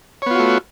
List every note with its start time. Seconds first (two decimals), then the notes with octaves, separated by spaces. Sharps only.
0.22 C#5
0.26 B3
0.31 F4
0.35 F#4
0.39 A3